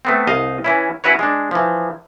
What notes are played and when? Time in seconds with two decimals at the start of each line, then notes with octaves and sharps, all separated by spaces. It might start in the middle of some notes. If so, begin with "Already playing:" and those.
0.05 A3 B3 C4
0.27 C2 D#5 F5
0.64 E3 C#4 E4
1.04 C#4 E4 F#4 B4 C#5
1.19 G#3 D4
1.51 E3 F3